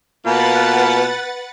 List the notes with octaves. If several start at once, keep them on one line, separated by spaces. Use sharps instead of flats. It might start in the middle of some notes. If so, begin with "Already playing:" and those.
B2 A#3 F4 B4 F#5 A6